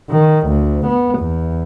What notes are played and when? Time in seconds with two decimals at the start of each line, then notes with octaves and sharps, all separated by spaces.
0.11 D#3
0.47 D2
0.87 B3
1.19 E2